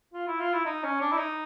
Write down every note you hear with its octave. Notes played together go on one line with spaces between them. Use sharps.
F4
E4
F4
E4
D#4
C#4
D4
E4
D#4